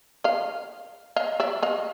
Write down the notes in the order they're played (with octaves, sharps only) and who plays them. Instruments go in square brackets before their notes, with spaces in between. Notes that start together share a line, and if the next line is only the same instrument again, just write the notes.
[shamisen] D#5 F5
D#5 F5
D5 E5
D#5 F5